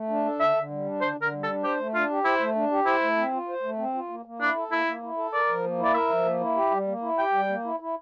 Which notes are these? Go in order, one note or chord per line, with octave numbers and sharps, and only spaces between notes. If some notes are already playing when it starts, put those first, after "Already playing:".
Already playing: A3
D4
A4
D3 E5
D3
G3
D4
D3 C5
D3
A#4
G3
A4
D4
G4 C5
A3
D4 F4
G4
E4 C5
A3
D4
G4
E4 C5
A3
C4
F4
C5
A3
C4
F4
A#3
A#3
D4 E4
A4
A#3 E4
A#3
E4
A4
A#4 D5
F3
A#3
E4
D5
A#4 E5
F3
A#3
E4
G4
G3
A#3
E4
G4 G5
G3
A#3
E4
E4